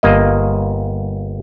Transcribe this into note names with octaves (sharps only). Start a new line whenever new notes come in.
G1 A#3 D#5